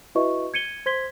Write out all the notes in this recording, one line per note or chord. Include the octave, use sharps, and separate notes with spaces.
E4 F#4 B4 D#5 E5 C#6
G#6 C#7 D#7 G7
C5 C6 G#6 B6 G7